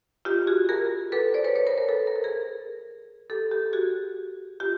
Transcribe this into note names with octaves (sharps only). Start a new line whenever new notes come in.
F4 G4
F#4 G#4
G#4 A#4
A4 B4
C5 D5
B4 C#5
B4 C#5
A#4 C5
A#4 C5
A4 B4
B4
A#4
A4
G#4 A#4
G4 A4
G4 A4
F#4 G#4
F4 G4